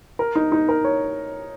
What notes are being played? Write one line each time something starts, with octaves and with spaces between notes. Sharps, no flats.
A#4
D#4
D#4
A#4
C#5